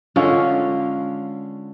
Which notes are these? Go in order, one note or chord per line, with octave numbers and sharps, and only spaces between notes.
D3 G#3 C#4 F4